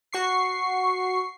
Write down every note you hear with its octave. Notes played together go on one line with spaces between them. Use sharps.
F#4 C#6 C7